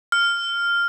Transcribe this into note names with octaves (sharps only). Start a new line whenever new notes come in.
F6